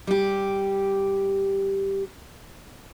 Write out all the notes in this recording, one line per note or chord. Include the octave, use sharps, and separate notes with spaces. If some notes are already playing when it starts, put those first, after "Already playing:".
G3 G4